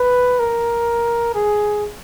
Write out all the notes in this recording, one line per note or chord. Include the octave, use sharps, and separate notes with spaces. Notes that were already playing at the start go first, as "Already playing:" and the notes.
Already playing: B4
A#4
G#4